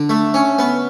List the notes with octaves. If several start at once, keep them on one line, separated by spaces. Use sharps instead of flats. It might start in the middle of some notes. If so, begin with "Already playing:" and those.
Already playing: D3
A3
C#4
B3